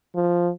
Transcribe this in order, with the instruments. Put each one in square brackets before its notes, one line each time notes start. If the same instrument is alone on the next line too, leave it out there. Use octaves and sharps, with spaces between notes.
[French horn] F3